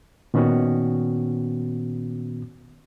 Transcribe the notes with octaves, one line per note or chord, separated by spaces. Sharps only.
A#2 D#3 B3 C#4 F#4